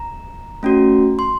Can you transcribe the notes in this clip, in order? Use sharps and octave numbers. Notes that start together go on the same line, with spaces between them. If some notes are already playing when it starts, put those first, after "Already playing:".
Already playing: A#5
A3 C#4 F#4
C6